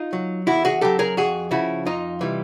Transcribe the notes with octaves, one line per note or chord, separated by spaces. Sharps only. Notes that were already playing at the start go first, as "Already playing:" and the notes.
Already playing: D#4 F4
F#3
E2 E4 F#4
F#4 G#4
C#3 F#3 G4 A4
G#4 A#4
F2 F#4 G#4
C#3 F3 E4 F#4
F2 D#4 F4
C3 E3 G3